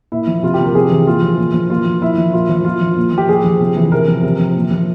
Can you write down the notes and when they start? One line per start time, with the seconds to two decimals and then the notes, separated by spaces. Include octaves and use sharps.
0.12 A#2 E4
0.27 F3
0.43 C3 F4
0.54 G4
0.59 F3 A#4
0.75 C3 G#4
0.90 E3
1.07 A#2 F4
1.22 F3
1.39 A#2
1.54 F3
1.70 A#2 F4
1.86 F3
2.01 A#2 E4
2.18 F3
2.33 A#2 F4
2.49 F3
2.65 A#2 F4
2.81 F3
2.97 A#2
3.13 F3 G4
3.29 A#2 G#4
3.44 F3
3.60 C3
3.76 E3
3.92 C3 A#4
4.08 F3
4.23 C3
4.39 F3
4.55 A#2
4.71 F3